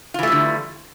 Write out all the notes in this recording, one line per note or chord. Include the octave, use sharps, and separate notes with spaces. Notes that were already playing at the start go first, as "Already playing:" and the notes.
D3 E3 G3 A3 F4